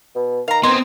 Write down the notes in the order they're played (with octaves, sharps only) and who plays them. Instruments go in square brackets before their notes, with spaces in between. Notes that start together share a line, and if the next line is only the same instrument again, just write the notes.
[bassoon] B2
[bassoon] D#3 [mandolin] F5 A#5
[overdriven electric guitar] B3 C4 [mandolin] D#5 G#5 [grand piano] C6